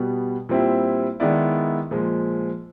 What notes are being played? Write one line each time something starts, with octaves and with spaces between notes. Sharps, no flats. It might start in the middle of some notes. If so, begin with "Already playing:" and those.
Already playing: B2 G3 B3
A#2 G3 C4 E4
D#3 G#3 B3 E4 D5
A#2 F3 G#3